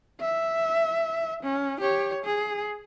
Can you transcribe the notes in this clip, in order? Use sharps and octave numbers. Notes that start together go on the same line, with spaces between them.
E5
C#4
G4 C#5
G#4